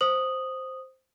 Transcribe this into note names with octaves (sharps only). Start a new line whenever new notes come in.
C5 D#6 F#7